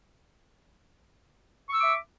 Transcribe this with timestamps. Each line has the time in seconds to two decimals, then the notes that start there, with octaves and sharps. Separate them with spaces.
1.69 C#6
1.73 E6
1.77 D6
1.82 E5